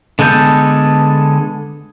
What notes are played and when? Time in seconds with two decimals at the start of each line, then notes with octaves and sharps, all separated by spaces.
0.19 D3 G#3 B3 A4 G6